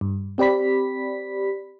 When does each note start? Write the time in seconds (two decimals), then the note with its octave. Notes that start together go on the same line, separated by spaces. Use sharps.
0.01 G2
0.38 C4 G4 D5 B5 B6